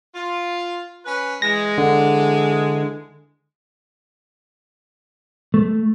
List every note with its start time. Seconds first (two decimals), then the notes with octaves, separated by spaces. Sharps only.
0.15 F4
1.05 C#4 B4
1.42 E3 G#3 A#6
1.78 D3
5.54 A3